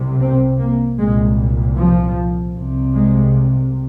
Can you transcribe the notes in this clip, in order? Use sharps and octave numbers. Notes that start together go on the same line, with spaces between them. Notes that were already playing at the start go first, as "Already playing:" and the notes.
Already playing: C2 C3
C4
A#3
C2 A#2 G#3
F3
C2 C3
G#3